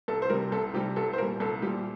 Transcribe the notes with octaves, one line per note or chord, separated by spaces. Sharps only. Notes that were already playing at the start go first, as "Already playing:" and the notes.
C2 A4
C5
C3 G3 A#4
C2 A4
C3 G3 G4
C2 A4
C5
A#2 G3 A#4
C2 A4
A#2 G3 G4